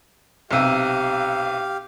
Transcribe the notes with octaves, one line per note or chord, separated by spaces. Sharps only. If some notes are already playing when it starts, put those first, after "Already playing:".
B1 C3 G4 F5